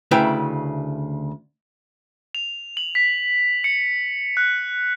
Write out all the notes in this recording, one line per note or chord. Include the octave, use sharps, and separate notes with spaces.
D2 C#3 E4 B4 G5 A#5
F7
F#7
B6
C#7
F#6